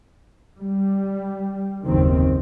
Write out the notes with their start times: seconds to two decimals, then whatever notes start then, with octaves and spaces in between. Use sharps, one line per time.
0.57 G3
1.83 F#1 D#2 D#3 C4